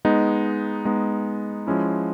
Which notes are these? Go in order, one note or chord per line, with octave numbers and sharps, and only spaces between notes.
G#3 B3 D#4
G#3 B3 D#4
F3 G#3 C#4 E4